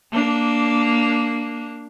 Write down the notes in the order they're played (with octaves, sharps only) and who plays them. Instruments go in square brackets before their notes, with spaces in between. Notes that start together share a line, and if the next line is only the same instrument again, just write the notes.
[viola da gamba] A#3 D4